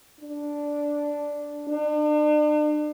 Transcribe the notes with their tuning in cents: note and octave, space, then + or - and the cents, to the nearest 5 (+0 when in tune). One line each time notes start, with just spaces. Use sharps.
D4 -5
D4 +40